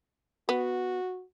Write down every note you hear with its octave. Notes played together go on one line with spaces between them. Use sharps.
B3 F#4